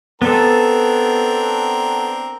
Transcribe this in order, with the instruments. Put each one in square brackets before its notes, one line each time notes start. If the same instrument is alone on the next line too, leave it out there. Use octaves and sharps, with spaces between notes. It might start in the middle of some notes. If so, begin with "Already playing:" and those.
[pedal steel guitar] B3 A4 [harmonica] C4 D4 A#4